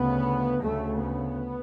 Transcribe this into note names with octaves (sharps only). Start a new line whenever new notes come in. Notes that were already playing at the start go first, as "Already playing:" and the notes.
Already playing: D2 C#3 B3
D2 C#3 A3
B3